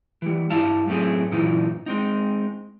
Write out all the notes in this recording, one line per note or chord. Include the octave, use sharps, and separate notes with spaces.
E3 G3
G2 G3 E4 F5 A5
F#2 A2 A3 C4 G#4
F#2 A#2 E3 D#4 E4
G#3 C4 D#4